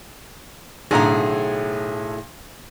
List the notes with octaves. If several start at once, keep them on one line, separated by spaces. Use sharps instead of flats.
B1 A2 D3 G#4 A#5